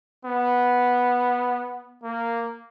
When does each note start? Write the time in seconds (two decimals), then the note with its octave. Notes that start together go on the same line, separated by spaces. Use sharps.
0.25 B3
2.03 A#3